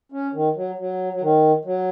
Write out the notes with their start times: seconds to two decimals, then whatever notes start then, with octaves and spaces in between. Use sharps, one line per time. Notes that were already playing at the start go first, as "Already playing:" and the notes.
0.12 C#4
0.33 D#3
0.56 F#3
0.78 F#3
1.13 F#3
1.21 D#3
1.65 F#3